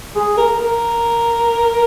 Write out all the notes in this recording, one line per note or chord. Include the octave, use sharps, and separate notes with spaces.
G#4
A#4
A#4